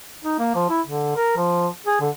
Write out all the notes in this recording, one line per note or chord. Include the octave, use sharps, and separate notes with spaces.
D#4
A#3
F3
E4
D3
A#4
F3
G#4
D3